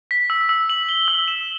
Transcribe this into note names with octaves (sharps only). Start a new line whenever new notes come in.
B6
E6
E6
F#7
G7
E6
E7